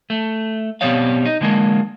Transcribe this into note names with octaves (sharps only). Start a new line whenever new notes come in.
A3
B2 G3 B3 C4 C#5 F5
D#4
D3 E3 G#3 A#3